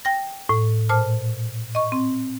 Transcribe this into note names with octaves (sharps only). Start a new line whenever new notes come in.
G5 A#6
A2
A#2 C5 A5 F6
D#5 C#6
C4